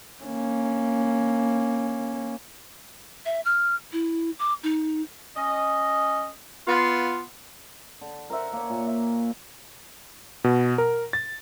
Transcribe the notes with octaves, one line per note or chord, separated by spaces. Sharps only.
A#3 C#4
E5
F6
E4
D6
D#4
C#4 D#5
B3 F4
D3
A#4 C5 E5 F#5
A#3 C#5
A#2
E5
B2
A#4
A6